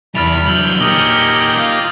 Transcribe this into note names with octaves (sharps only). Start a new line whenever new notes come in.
E2 G3 E4 B5 F6 A6 F7
D3 F#3 E6 G6 F#7
A#2 A#3 C#4 D#4 G4
F4